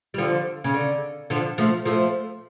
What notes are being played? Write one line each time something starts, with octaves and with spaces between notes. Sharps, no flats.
G3
D3 F3
C#3
D3
D3 F3
F3 A3
F3 A3